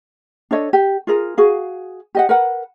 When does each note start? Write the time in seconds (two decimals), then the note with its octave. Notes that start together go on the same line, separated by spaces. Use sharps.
0.51 D4 A4 C#5 D#5
0.73 G4
1.07 F4 G#4 A#4
1.37 F#4 G#4 F5
2.15 G4 D#5 F#5
2.29 A#4 B4 F#5